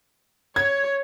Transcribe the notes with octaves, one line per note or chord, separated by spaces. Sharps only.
C#5 G#6